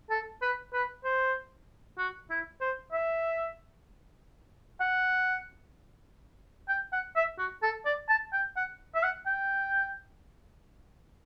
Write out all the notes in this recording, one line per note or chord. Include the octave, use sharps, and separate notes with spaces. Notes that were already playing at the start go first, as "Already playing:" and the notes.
A4
B4
B4
C5
F#4
E4
C5
E5
F#5
G5
F#5
E5
F#4
A4
D5
A5
G5
F#5
E5
F#5
G5